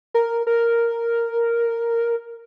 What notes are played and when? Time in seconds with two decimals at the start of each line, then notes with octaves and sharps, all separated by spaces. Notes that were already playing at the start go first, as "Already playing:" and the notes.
0.14 A#4
0.47 A#4